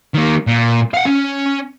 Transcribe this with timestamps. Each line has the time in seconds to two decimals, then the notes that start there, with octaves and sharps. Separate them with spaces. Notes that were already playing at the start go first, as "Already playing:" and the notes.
0.14 D#3 A#3
0.47 A#2
0.94 F5 F#5
1.05 C#4